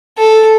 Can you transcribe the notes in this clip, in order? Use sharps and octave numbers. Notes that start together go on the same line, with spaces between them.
A4